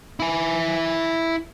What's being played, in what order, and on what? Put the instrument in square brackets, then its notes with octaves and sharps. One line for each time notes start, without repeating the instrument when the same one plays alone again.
[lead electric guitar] E4 G#5